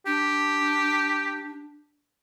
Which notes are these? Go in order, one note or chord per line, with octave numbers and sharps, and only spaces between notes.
D4 G4